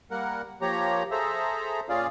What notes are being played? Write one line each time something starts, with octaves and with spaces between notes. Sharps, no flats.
G3 A#3 A#4 F#5
F3 A#3 G4 C#5 A#5
G#4 A4 C5 E5 A#5
A#2 C#4 F4 G#4 D5 F5